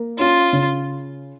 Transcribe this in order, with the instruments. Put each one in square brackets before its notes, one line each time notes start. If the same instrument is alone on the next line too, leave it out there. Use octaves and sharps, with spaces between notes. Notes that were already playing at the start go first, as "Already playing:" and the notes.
Already playing: [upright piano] A#3 A#4
[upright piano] C#4 [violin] F4
[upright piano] C#3